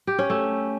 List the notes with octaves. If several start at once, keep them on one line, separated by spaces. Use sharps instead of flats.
G4
C#4
A3